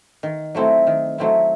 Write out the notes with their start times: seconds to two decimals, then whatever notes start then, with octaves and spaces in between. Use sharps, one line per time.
0.23 D#3
0.55 F#3 A3 C4 E4
0.87 D#3
1.18 F#3 A3 C4 E4